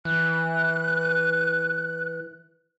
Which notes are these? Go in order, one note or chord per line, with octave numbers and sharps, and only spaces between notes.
E3 F#6